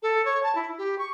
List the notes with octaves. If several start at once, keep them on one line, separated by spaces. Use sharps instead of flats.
A4
C#5
A5
E4
G4
C#6